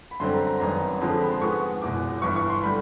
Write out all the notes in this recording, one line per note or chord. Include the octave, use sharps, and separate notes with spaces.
B5
F#2 D3 G3 C4 C6
A#5
A#5
G#1 F#2 D#3 G3 B3 A#5
F2 D3 F3 G#3 C4
B5
C6
G#2 F3 G#3 B3 C#6
F#1 E2 B2 D6
G1 G2 E3 C#6
C#6
C6
D3 G3 B5